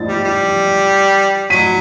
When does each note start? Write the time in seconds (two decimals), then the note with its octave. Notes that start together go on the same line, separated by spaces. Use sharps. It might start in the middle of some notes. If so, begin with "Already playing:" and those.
Already playing: A6
0.08 G3
0.24 G3
1.50 F#3 B6 D#7